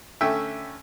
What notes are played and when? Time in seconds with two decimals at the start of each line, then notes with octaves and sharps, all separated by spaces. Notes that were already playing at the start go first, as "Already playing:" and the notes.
0.21 D3 A3 C#4 E5 G5